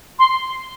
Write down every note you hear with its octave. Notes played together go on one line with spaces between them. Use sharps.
C6